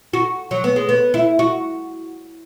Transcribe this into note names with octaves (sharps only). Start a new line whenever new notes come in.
F#4
F#3
B3
G#3
B3
E4
F#4